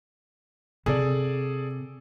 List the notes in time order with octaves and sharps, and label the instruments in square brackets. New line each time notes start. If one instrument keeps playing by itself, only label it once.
[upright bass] C3 [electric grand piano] G#4 A4 D5